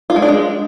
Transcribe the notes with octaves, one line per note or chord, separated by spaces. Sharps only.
F4
G#3
D4
G#3